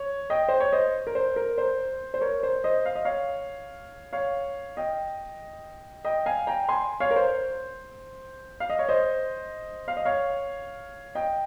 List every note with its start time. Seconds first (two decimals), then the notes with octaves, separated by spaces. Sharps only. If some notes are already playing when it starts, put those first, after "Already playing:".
Already playing: C#5
0.30 D#5 G5
0.48 C5
0.60 C#5
0.72 C5 D#5
1.07 A#4
1.15 C5
1.36 A#4
1.58 C5
2.14 C5
2.21 A#4 C#5
2.43 C5
2.64 C5 D#5
2.85 F5
2.96 D#5
3.05 C#5 F5
4.13 C#5 F5
4.77 D#5 G5
6.05 D#5 G5
6.26 F5 G#5
6.47 G5 A#5
6.69 G#5 C6
7.00 C#5 F5
7.11 A#4
7.16 C5
8.60 F5
8.70 D#5
8.79 C#5
8.89 C5 D#5
9.88 F5
9.97 D#5
10.05 C#5 F5
11.15 D#5 G5